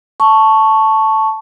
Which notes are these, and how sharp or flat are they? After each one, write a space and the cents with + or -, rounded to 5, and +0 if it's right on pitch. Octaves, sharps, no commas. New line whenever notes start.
A5 +0 C#6 +0